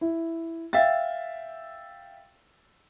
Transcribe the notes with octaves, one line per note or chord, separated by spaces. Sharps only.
E4
E5 F5 G5 A6